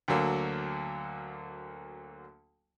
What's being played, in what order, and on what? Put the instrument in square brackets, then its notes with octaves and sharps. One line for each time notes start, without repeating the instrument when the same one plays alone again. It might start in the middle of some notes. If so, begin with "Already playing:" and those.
[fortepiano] D2 D3 F#3 A#3